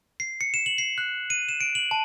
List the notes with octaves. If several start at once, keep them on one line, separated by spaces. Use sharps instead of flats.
C7
C#7
E7
F#7
C7
F#6
D#7
E7
D7
F#7
A5